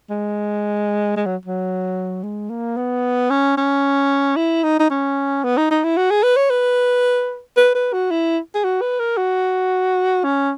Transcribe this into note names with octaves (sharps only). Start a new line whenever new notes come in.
G#3
G#3
F#3
F#3
G#3
A#3
B3
C#4
C#4
E4
D#4
D#4
C#4
B3
D#4
D#4
E4
F#4
G#4
B4
C#5
B4
B4
B4
F#4
E4
G#4
F#4
B4
A#4
F#4
C#4